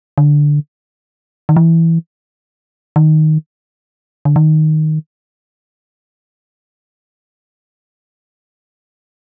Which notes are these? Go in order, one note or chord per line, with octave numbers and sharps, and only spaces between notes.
D3
D#3
E3
D#3
D3
D#3